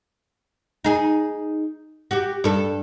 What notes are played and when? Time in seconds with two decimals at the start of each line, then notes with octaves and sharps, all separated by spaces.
0.84 D#4 G#4
2.11 F#4 G4
2.44 G2 A4